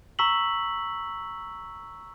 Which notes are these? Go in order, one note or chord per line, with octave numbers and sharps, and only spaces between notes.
A#5 C#6 E6 B6 F#7